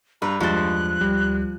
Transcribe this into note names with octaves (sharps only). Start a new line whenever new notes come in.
G2 B4 A#5
E2 G2 F3 G#3 C5 F#6 A6
D2 G3